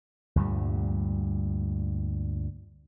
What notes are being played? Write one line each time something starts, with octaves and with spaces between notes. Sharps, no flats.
D2 G2 A#2 G3